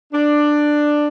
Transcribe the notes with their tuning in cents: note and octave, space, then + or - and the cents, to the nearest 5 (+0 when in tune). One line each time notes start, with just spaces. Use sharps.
D4 +10